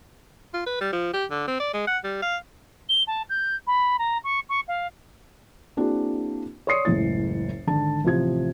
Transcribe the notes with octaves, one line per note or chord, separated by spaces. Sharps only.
F4
B4
G3
F3
G4
D3
C4
D5
G#3
F#5
G3
F5
G7
A5
G6
B5
A#5
C#6
C#6
F5
A#3 C4 D4 E4 F#4 G#4
C#5 D5 C6 D#6 C7 C#7
F#1 C#2 A2 E3 A6
G#1 D3 D4 A5
A1 C3 F3 G#6